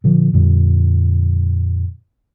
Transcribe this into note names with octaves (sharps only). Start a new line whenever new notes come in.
A#2 D3 F3
F2 A#2 D3 G3